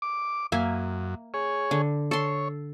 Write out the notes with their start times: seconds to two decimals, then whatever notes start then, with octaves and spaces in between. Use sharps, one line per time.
0.02 D6
0.52 F#2 A#3 E5 G#5
1.34 G#4 C#5
1.71 D3
2.11 A4 C#5 C6